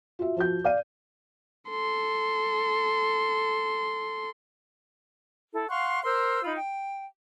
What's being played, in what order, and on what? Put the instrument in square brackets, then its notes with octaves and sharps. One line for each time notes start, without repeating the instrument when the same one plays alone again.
[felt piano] F4 F#4 E5
F3 F#4 G6
D5 F5 D#7
[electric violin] A4 C6
[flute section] E4 A4
F5 F#5 C6 C#6
A#4 C5 C6 E6
D#4 F4 B5
G5